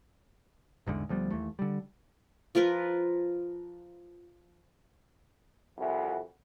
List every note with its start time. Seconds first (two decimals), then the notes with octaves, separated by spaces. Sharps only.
0.86 A1 E2 G#2 D3
1.09 D2 F3 G3 B3
1.31 D#2 E3 A3
1.59 D3 G3
2.55 F3 F4 A#4 B4
5.78 C2 F2 E3 F3 F#4